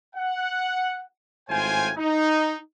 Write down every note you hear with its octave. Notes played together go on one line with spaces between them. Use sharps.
F#5
G#1 A2 F4 C5 G5 G#5
D#4